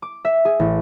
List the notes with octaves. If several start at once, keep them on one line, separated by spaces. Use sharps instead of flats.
D6
E5
G#4
A1